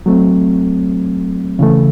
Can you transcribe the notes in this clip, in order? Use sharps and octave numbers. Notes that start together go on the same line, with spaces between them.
F#3 A3 C4
C#3 E3 A3